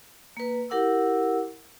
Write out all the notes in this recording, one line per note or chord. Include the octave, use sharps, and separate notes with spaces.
A#3 B4
E4 G4 A#4 F#5 D6 E6